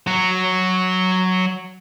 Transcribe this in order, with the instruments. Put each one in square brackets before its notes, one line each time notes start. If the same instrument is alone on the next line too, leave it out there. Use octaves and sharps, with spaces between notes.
[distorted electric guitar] F#3 F#4